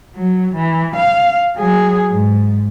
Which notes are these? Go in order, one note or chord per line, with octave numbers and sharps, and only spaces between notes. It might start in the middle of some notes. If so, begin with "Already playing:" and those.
F#3
E3
F5
F#3 G#4
G#2